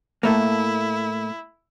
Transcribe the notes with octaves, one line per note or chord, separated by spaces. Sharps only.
A2 A3 A#3 E4